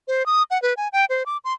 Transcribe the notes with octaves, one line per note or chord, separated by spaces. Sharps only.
C5
D#6
F#5
B4
G#5
G5
C5
D6
C6